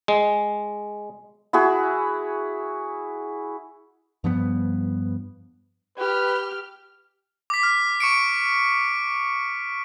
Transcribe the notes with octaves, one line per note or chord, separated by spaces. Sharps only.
G#3
E4 F#4 G#4
G2 F3 G3 B3
G4 B4 F6
D6 B6
F6
C#6 C#7 D7